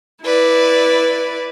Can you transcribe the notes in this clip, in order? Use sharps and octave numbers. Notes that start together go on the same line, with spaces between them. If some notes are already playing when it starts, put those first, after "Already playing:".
E4 B4 D5